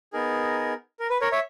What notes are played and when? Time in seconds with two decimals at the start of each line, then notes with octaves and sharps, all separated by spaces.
0.13 B3 D#4 G#4 A#4
1.00 A#4
1.10 B4
1.21 A#4 C#5
1.32 C#5 E5